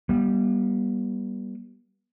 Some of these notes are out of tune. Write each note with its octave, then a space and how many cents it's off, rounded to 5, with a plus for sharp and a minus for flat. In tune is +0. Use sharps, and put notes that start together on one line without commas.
G3 -5 B3 -40